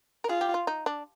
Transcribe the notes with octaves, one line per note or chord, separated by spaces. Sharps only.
A#4
F4 G#4
G4
F4
D#4
D4